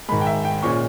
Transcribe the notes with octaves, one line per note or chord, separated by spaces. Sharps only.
G#2 D#3 G#3 B5
G5
E5
G5
A#2 G#3 C#4 C#6